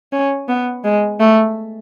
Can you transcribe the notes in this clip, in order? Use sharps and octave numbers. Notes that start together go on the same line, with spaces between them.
C#4
B3
G#3
A3